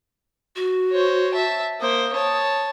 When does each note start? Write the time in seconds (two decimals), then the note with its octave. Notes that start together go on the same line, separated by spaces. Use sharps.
0.56 F#4
0.92 C5 C#5
1.34 E5 A5
1.80 A#3 C5 D#6
2.13 C#5 A5